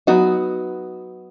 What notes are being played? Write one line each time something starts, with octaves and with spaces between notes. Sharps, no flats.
F#3 B3 D#4 F#4